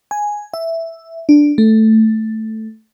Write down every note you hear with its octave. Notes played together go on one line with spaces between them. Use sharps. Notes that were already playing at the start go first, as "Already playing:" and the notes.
G#5
E5
D4
A3